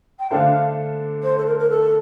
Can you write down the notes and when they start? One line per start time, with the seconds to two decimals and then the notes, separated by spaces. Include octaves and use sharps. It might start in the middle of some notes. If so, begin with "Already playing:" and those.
0.19 G5
0.30 D3 A3 D4 A4 C5 F5
1.22 C5
1.37 A4
1.46 A#4
1.59 A#4
1.69 A4